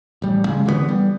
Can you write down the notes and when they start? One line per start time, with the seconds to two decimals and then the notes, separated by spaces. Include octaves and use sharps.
0.22 A1 G3
0.46 C#3 G#3
0.66 D3 E3 G3 B3
0.89 G3